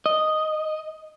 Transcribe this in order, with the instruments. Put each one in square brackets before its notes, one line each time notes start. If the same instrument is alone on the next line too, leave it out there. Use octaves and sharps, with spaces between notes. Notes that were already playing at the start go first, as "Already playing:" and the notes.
[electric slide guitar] D#5